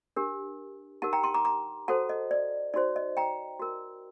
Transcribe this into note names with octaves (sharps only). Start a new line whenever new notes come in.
D4 G4 A#4
D#4 G4 A#4 F#5 A5
G5 A#5
A5 C6
A#5 D6
A#5 D6
F#4 A4 C5 F#5 A5
D#5
D5
D#4 F#4 C5 D5
D#5
G5 A#5
F#4 A#4